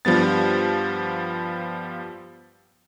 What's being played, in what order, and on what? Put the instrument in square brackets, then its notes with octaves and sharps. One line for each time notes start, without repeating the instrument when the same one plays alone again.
[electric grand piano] G2 F3 G3 B3 A6